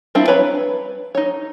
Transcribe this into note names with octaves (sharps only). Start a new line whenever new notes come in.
G3 C4 D4 E4 F4
B4 C#5 A#5 B5
D#4 C#5